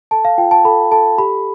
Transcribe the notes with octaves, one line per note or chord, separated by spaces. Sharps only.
A4 A5
F5
F4 G5
A5
A4 B5
A4 A5
G4 B5